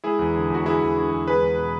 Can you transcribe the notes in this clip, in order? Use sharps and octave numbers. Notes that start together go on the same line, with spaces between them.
G#3 E4 G#4
E2
D3
E2 F#4
G#3 E4 G#4
E2
D3
E2
G#3 G#4 B4
E2
B2